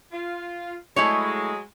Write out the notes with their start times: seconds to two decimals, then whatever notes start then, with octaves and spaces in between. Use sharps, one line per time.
0.12 F4
0.96 F#3 G#3 A3 E4 C#5